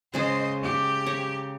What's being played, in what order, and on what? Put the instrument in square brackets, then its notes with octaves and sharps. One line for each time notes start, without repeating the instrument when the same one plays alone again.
[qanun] C#3 G#3 C#4 [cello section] C5 D#5
[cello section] G4
[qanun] C#5 A#5